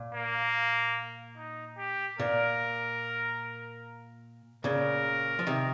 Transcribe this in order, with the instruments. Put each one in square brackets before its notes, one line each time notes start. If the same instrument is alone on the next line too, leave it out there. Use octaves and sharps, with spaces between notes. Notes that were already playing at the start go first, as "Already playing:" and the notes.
Already playing: [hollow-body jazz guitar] A#2
[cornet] A#3
D#4
G4
[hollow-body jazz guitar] A#2 [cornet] A#4
[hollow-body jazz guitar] A#2 C#3 [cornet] A#4
[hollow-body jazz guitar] F3
C3 D#3